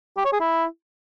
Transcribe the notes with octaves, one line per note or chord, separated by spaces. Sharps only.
G4
C#5
G#4
E4